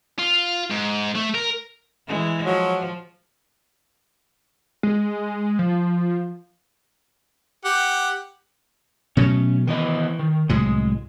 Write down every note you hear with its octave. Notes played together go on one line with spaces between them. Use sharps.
F4
G#2
A3
A#4
E3 G#3
F3 F#3
G#3
F3
G4 F#5
B2 F#3 A3 C#4
D#3 E3 B3 D#5
D#3
C2 A2 F#3 G#3